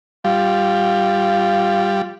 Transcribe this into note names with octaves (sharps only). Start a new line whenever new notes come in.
G3 F4